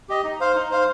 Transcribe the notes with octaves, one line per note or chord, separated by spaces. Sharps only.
G4 D#5
D#4
C5 F5
D#4
C5 F5